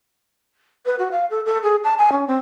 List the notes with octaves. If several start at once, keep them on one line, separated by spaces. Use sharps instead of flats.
B4
F#4
F5
A4
A4
G#4
A5
G#5
C#4
C4